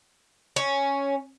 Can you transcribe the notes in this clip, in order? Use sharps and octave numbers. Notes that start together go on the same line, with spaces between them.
C#4